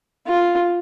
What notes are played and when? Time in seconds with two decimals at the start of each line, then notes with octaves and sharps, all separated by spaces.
0.27 F4